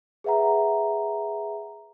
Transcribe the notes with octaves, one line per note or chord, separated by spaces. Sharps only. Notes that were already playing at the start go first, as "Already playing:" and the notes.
G#4 B4 E5 F#5 A#5